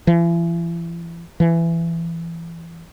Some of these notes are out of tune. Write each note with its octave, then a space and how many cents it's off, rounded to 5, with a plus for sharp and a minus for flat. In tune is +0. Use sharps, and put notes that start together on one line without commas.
E3 +40
E3 +20